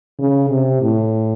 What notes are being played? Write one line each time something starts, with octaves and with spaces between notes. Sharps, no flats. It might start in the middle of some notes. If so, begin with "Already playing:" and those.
C#3
C3
A2